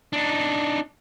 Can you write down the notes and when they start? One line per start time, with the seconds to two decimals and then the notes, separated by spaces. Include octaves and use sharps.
0.13 D4 D#4